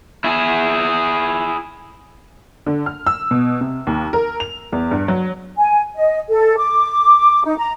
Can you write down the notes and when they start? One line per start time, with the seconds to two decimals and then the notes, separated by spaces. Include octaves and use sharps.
0.24 E4 G#4
2.66 D3
2.86 F6
3.07 E6
3.31 B2
3.61 C3
3.87 D#2
4.13 A#4
4.40 F7
4.72 E2
4.91 G2
5.08 F#3
5.58 G#5
5.96 D#5
6.30 A4
6.58 D6
7.45 D#4
7.58 A#5